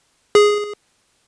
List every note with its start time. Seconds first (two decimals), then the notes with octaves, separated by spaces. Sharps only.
0.35 G#4